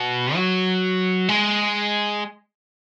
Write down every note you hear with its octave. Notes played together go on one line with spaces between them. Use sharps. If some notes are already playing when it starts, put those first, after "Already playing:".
Already playing: B2
F#3
G#3